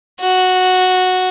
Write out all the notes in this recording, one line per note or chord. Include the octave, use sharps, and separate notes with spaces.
F#4